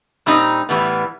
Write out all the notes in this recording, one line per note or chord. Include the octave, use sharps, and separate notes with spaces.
A#2 G3 C4 D#4
A2 E3 G3 B3